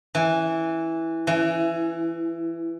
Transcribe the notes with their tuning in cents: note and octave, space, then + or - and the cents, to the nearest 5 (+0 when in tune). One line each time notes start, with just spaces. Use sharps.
E3 -5
E3 +20